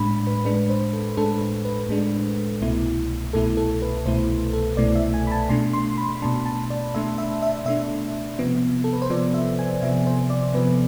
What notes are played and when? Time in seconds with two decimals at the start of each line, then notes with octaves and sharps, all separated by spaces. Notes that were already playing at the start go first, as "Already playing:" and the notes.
Already playing: A2 G#3 D4 B5
0.27 B4
0.45 A2 G#3 D4 B4
0.69 C5
0.93 A4
1.17 A2 G#3 D4 A4
1.41 A4
1.65 B4
1.89 A2 G#3 D4
2.61 C2 B2 A3 E4
3.33 C2 B2 A3 E4 A4
3.57 A4
3.82 B4
4.05 C2 B2 A3 E4 C5
4.53 A4
4.77 C2 B2 A3 E4 D5
4.95 E5
5.14 G#5
5.27 B5
5.31 A5
5.49 B2 A3 D4 C6
5.73 C6
5.98 B5
6.22 B2 A3 D4 A5
6.46 A5
6.70 D5
6.94 B2 A3 D4 E5
7.18 E5
7.42 E5
7.65 B2 A3 D4 E5
8.39 C3 F3 B3
8.84 A4
8.93 B4
9.02 C5
9.10 C3 F3 B3 D5
9.34 E5
9.59 G#5
9.82 C3 F3 B3 E5
10.07 C5
10.30 D5
10.54 C3 F3 B3 B4